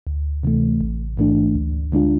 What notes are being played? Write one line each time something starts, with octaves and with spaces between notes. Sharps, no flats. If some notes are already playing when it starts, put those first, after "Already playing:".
D2
C3 E3 A3
A1
G#2 E3 A3 D4
D2
D3 G#3 D4 F4